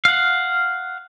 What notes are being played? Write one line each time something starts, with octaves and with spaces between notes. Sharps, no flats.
F5 F#5